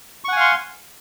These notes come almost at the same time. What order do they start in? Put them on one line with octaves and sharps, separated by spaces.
C#6 F#5 G#5 F5 C6